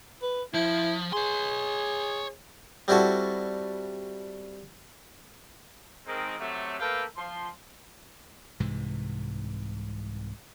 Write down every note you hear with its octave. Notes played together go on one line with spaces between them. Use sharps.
B4
F3 E4
G#4 C#5 C6
G3 C4 E4 F#4 A4
D#3 G#3 C4
C3 F#3 A3
A3 A#3 A4 B4 F5 G5
F3 C6
C2 G#2 C3 E3